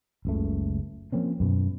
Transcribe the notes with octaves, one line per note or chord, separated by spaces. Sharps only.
F#1 C#2 A3
F3 A#3 C4 C#4
F#2 B2